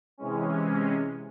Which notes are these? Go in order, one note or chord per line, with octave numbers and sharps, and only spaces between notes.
C3 E3 G#3 C#4